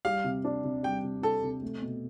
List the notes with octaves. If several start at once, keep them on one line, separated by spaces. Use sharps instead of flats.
G3 F5
C3
D4
C3
G3 G5
C3
D4 A4
C3
A3
B2